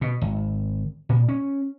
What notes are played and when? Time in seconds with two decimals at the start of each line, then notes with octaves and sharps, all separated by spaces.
0.01 B2
0.22 G#1
1.09 A#2
1.29 C#4